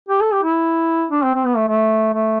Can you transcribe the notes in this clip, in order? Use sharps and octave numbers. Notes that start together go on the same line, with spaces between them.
G4
A4
G4
E4
D4
C4
C4
B3
A3
A3
A3